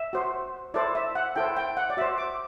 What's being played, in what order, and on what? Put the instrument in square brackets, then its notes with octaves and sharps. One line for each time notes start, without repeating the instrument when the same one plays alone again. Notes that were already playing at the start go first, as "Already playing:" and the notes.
Already playing: [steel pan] E5
F#4 C5
E4 A4 C5 D5
E5
F#5
E4 A4 C5 G5
G5
F#5
D5
F#4 C5 E5
D6